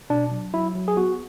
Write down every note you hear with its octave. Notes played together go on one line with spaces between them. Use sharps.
B2 D4
F#3
F#3 E4
F#3
G#4
B3 F#4